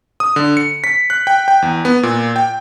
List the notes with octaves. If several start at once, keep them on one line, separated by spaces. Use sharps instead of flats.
D#6
D3
C#7
B6
F#6
G5
G5
E2
B3
A#2
G5